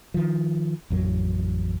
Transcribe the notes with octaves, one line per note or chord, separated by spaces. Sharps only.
D#3 F3
A1 F2 F#3